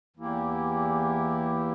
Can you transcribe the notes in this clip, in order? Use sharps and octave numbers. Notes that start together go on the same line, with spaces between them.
E2 E3 A#3 E4 G4